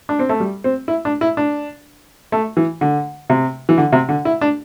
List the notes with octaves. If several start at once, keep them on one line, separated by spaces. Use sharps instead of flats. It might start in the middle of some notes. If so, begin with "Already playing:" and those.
D4
C4
A3
G3
C4
E4
D4
E4
D4
A3
E3
D3
C3
E3
D3
C3
D3
E4
D4